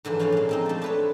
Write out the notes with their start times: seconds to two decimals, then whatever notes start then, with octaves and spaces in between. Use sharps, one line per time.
0.05 G#2 D3 E3 F3
0.19 C#4 F4 C5 D5 F#5
0.32 A#2 G#3
0.49 F3 C4 D#4
0.66 A3 D5
0.82 D4 B4 C#5